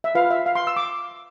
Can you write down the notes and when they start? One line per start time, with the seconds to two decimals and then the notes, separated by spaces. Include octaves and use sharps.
0.04 E5
0.15 F4 B4 F5
0.31 E5
0.46 F5
0.55 C6
0.67 E6
0.76 D6